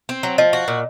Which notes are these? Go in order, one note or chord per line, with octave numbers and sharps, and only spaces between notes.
C4
F#3
F3 D#5
F#4
A#2